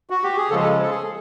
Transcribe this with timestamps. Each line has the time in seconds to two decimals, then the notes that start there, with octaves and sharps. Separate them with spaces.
0.10 F#4
0.23 G4
0.37 G#4
0.50 C#3 F3 G#3 A4
0.63 A4
0.82 A4
0.91 G#4